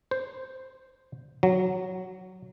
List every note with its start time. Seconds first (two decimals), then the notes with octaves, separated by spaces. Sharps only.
0.11 C5
1.43 F#3